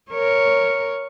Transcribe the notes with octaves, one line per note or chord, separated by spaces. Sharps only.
A#4 C#5